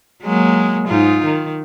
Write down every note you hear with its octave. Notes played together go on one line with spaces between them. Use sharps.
F#3 G#3 A#3
G#2 D#4 F4
D#3